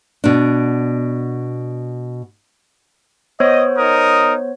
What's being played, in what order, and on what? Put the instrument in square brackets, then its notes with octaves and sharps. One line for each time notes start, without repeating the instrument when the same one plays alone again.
[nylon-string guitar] B2 D4
[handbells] B3 C5 C#5 [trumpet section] D#5
[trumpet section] D#4 A#4 D#6